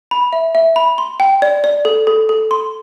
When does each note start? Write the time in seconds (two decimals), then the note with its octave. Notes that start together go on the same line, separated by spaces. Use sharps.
0.11 B5
0.33 E5
0.55 E5
0.76 B5
0.98 C6
1.20 G5
1.42 D5
1.64 D5
1.85 A4
2.07 A4
2.29 A4
2.51 C6